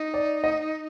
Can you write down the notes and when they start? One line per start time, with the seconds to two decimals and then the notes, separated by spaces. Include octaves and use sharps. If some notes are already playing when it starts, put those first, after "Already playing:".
Already playing: D#4
0.14 D5
0.44 D#5